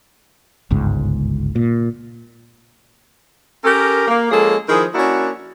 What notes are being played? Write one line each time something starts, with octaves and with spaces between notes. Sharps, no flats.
G1 C#2 G#2
A#2
C#4 G4 A4 A#4
A#3
F3 G#3 A#3 C#4 G#4 A4
D#3 F3 E4 G#4
A#3 C#4 D4 E4 F#4